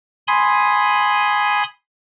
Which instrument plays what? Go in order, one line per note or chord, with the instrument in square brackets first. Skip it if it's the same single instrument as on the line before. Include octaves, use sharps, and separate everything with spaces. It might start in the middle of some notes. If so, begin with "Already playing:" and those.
[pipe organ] G#5 B5 C6 D#6